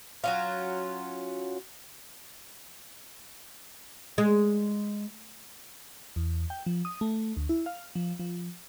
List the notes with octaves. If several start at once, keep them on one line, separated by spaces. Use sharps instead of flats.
F#3 C#4 F4
G#3
E2
G5
F3
D#6
A3
D2
E4
F5
F3
F3